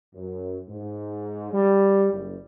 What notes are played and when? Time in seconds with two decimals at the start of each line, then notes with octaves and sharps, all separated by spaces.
0.15 F#2
0.70 G#2
1.53 G3
2.12 F#1